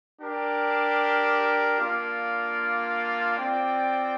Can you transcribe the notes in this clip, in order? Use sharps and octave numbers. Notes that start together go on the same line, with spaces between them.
D4 G4 A#4
A#3 D4 F4 D5 F5
C4 F4 D5 G5